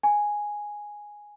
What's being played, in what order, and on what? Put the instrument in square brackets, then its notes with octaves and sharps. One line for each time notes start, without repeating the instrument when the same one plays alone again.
[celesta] G#5